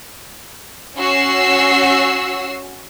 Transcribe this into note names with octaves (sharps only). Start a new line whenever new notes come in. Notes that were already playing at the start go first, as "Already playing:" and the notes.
C#4 F#4 E6 C7